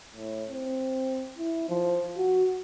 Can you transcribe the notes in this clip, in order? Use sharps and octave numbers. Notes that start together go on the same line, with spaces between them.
A2
C4
E4
F3
F#4